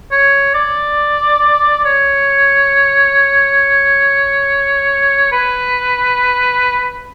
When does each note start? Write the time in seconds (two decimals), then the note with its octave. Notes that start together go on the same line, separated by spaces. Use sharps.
0.11 C#5
0.54 D5
1.85 C#5
5.32 B4